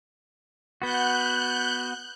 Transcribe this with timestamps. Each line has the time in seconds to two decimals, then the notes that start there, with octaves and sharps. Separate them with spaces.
0.82 B3 F#4 F#6 G6